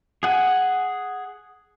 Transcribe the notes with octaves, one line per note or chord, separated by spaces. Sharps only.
G#4 F#5 G#5